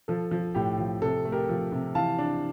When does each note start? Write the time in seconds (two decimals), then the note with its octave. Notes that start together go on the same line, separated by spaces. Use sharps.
0.08 F3 A4
0.31 F3
0.55 A2 G4
0.79 F3
1.02 C3 A4
1.25 A3
1.32 G4 A#4
1.49 F3
1.72 C3
1.95 E3 F5 A5
2.18 D4